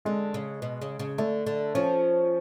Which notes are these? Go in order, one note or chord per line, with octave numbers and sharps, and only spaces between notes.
D3 G#3
C#3
B2
C#3
C#3
D3 A3
D3
F3 C#4